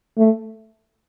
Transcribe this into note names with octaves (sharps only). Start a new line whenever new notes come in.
A3